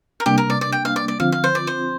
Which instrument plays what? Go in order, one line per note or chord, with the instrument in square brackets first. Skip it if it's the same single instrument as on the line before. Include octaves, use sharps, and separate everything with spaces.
[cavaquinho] A#4
[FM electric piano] C3 G3 A#3 D4 [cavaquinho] G4
[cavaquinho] A#4
D5
D5
G5
F5
D5
D5
[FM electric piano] D3 F3 C4 F4 [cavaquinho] F5
[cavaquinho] F5
C5
D5
C5